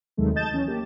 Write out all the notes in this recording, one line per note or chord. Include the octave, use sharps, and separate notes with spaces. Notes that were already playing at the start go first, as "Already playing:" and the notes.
D#2 C3 D#3 F#3 G#3 A3
D#5 A5 G6 A6 E7
E3 C#4
A#3 G4